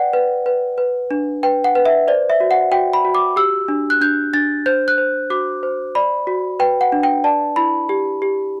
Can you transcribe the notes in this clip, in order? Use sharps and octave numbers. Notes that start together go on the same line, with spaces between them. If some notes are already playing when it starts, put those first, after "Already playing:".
Already playing: B4 D5 F#5 G5
B4
B4
B4
D4
B4 G5
F#5
B4
E5
C5 D5
E5
F#4
F#5
F#4 G5
B5
F#4
D6
G4 E6
D4
F#6
D4 G6
D4 A6
C5 G6
F#6
C5
F#4 D6
C5
D5 B5
F#4
B4 G5
F#5
D4
G5
D5 A5
E4 B5
G4
G4